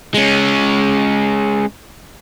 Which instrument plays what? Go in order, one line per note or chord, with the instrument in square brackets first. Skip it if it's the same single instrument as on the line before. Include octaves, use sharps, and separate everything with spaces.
[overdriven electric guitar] G#3 C#4